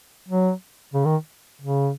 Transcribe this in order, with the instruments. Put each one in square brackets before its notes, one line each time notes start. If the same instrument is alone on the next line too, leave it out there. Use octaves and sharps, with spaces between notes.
[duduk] F#3
C#3
D#3
C#3